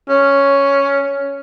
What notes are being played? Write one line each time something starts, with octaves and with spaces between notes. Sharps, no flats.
C#4